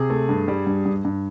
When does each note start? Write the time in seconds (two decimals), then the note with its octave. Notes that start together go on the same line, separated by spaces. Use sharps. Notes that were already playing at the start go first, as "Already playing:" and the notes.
Already playing: C3 G#4
0.10 A3
0.29 G2
0.48 G3
0.67 G2
0.86 G2
1.05 G2